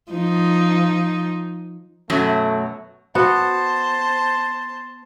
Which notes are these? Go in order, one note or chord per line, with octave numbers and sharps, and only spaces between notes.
F3 D#4
F#2 B2 F#3 A3
B3 F#4 C5 A5